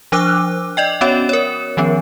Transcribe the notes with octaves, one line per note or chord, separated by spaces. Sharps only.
F3 D4 C5 D6 E6 F#6
D5 D#5 G5
B3 C#4 F#4 C#5
A#4 C#5
D#3 F3 B3 C#4